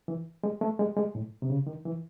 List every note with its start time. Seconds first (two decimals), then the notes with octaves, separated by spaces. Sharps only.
0.08 E3
0.44 G#3
0.61 A3
0.79 G#3
0.97 G#3
1.15 A2
1.42 C3
1.50 C#3
1.67 D#3
1.85 E3